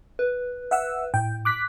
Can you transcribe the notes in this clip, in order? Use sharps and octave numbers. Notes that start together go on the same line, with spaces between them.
B4
E5 F#5 E6
A2 G5
D6 F#6 B6